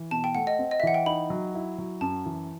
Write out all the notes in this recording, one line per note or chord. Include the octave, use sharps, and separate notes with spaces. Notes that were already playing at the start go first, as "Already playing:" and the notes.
Already playing: E3
B2 A5
G5
A3 F#5
D#5
C4
D#5
E5
E3 F#5
G5
D#4 B5
F#3
E4
F#3
F#2 A5
E3